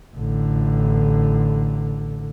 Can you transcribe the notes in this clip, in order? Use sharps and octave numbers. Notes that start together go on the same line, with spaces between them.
A1 D3